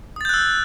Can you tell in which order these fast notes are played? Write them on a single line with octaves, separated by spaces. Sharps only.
D#6 A6 G6 F#6 E6